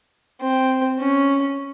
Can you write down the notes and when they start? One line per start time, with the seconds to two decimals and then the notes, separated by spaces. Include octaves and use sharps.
0.40 C4
1.00 C#4